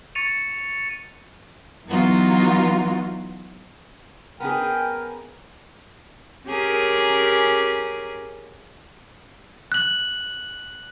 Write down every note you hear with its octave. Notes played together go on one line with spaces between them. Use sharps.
C#6 A6 C#7 D#7 F7
E3 F#3 B3 D#4 F4 F#4
B3 C#4 G#4 A#4 G5
C#4 G4 G#4 A#4
F#6 F#7